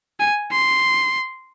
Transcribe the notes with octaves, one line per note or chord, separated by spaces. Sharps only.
G#5
C6